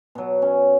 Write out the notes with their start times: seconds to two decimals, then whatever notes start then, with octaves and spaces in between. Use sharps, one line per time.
0.15 B2 F#3
0.42 C#4